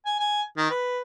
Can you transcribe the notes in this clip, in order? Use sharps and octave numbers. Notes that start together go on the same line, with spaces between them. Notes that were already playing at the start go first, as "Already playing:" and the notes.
G#5
G#5
D#3
B4